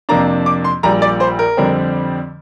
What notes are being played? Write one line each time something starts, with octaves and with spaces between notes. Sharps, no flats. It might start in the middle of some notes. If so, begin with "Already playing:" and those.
F2 C3 A#3 D4 A#5
D6
C6
A#1 A#2 G3 A#5
D5
C5
A#4
F2 D3 G3 C4